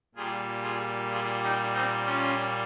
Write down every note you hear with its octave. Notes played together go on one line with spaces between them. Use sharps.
A#2 G3 F4 G#4
F4 G#4
F4 G#4
D#4 G4
C4 D#4
C#4 F4